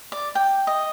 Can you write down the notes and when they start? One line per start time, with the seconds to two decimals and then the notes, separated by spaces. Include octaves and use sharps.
0.12 D5
0.35 G5
0.67 D#5